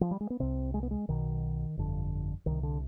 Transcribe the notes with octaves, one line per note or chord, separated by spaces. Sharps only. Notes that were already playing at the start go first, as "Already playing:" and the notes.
F3
G3
G#3
B3
C2 C3 C4
G#3
B3
G#3
B1 B2 D#3
G1 F2 D3
C2 C3 D#3
D3